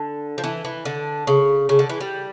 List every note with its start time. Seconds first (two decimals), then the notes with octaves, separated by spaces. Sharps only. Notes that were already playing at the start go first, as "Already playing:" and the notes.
Already playing: D3
0.38 F3
0.44 E3
0.65 E3
0.85 D3
1.27 C#3
1.69 C#3
1.79 D3
1.89 E3
2.01 G3